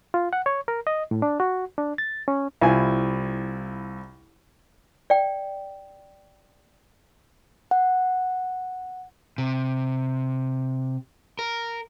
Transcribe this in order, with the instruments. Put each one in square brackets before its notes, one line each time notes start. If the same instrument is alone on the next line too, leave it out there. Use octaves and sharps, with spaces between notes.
[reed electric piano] F4
F#5
C#5
A#4
D#5
A2
D4
F#4
D4
A6
C#4
[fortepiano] C2 E4 F4 G#5
[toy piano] D5 G5
[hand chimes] F#5
[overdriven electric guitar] C3
A#4